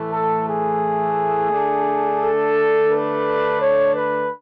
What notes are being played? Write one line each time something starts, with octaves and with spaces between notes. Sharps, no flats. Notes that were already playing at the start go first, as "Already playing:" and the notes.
Already playing: A2 E3 A3
A4
G#4
D3 A3 D4
A4
B4
C#5
B4